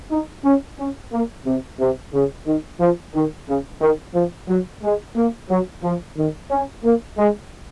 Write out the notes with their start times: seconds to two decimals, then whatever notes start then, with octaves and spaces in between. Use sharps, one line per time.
0.10 D#4
0.44 C#4
0.78 C#4
1.12 A#3
1.45 C3
1.80 C3
2.13 C#3
2.46 D#3
2.80 F3
3.14 D#3
3.47 C#3
3.80 D#3
4.14 F3
4.48 F#3
4.83 G#3
5.16 A#3
5.49 F#3
5.83 F3
6.17 D#3
6.51 C#4
6.84 A#3
7.18 G#3